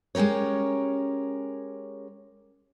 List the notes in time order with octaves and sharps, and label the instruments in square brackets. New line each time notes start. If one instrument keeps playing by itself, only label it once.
[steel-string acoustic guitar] G#3 C#4 G4 A#4 C#5